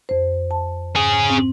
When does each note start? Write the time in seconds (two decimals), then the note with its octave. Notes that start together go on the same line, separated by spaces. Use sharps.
0.09 F2 C5
0.51 A5
0.96 G#2 C#4 G#4
1.30 C4